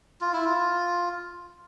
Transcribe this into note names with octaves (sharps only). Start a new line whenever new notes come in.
F4
E4
F4